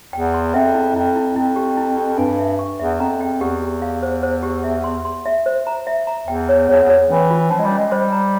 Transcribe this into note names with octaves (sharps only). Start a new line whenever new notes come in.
E2 G5
C6
F2 E5
E4
F2 E4
E4
F2 E4
G4
E4
G4
G2 G#5
E5
C#6
E2 E5
F2 A#5
G5
E2 G4
G4
F5
C5
C5
G4
E5
C6
C6
E5
C5
A#5
E5
A#5
E2 G5
C#5
E2 C#5
E2
C#5
E3 C#4
F4
F3 C#4
G#3
G3
C#4
G#3
G3 C5
A#5